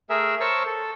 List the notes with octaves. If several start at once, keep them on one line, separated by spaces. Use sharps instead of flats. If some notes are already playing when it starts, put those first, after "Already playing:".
A3 G#4 A#4 E5
A#4 C5 C#5 A5 C#6 E6
A4